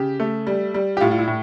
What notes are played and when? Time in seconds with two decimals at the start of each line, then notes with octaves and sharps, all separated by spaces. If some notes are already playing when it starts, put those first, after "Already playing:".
Already playing: C#3 G4
0.20 A3
0.47 G3
0.74 G3
0.97 G4
1.00 A2 F4
1.11 F4
1.18 E4
1.27 A2